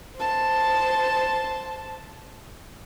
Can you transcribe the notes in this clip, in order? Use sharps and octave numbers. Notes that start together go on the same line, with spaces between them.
C5 A5